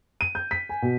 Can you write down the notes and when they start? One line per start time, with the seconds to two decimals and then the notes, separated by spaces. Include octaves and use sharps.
0.21 D#7
0.35 G6
0.51 B6
0.69 G#5
0.82 B2